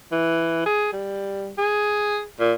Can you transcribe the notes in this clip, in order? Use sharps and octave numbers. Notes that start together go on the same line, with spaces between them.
E3
G#4
G3
G#4
A#2